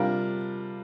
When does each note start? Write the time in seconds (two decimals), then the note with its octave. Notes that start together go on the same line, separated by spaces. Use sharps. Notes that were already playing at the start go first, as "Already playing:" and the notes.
Already playing: C3 G3 D4 F4 A#4